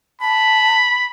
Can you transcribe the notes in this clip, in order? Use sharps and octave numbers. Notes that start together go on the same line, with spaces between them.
A5 B5